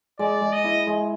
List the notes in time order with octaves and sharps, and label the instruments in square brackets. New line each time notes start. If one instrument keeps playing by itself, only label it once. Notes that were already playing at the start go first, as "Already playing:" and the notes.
[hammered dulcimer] G#3 [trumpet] D5
[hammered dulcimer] G#3
[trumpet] D#5
[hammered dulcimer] E4
G#3